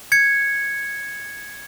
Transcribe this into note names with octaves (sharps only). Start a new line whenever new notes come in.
G#6 C#7